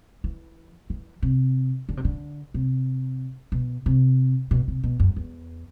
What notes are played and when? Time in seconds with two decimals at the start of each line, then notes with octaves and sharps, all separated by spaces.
0.24 E3
0.90 E3
1.22 C3
1.89 D3
1.97 C3
2.05 D3
2.54 C3
3.52 B2
3.86 C3
4.51 B2
4.68 C3
4.84 B2
5.00 F#2
5.16 E2